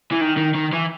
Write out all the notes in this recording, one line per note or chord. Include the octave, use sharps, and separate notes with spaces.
E3
D#3
D#3
D#3
E3